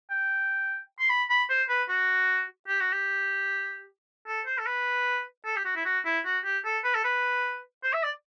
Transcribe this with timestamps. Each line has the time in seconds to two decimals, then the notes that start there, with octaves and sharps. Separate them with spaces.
0.10 G5
1.00 C6
1.09 B5
1.30 B5
1.49 C5
1.69 B4
1.89 F#4
2.68 G4
2.80 F#4
2.92 G4
4.27 A4
4.46 C5
4.58 A4
4.66 B4
5.45 A4
5.56 G4
5.65 F#4
5.76 E4
5.85 F#4
6.05 E4
6.25 F#4
6.45 G4
6.65 A4
6.84 B4
6.95 A4
7.04 B4
7.83 C5
7.93 E5
8.03 D5